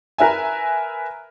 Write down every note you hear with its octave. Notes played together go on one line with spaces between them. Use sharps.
A#4 B4 E5 G#5